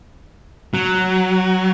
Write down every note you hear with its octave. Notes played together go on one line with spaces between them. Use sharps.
F#3